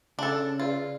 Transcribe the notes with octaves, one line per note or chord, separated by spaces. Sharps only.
C#3 D4 A4
F4 G#4 B4 D5